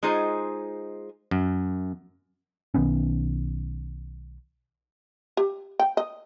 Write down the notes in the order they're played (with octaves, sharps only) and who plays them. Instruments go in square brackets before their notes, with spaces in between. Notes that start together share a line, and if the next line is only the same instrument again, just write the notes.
[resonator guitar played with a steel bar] G#3 D#4 F4 G#4 C5
[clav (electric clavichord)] F#2
[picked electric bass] B1 D#3 B3 C#4
[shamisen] G4
G5
D#5